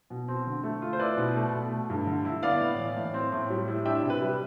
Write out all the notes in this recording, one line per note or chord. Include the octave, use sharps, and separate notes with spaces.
B2
C4
D3
A3
F4
C5
E4 B4 D5
B2
A3
B2
A3
G2
D3
E4
B3 D5 F5
A2
E3
A2
C4
A2
G3
E4
D4 E5 G5
C3
B4
G3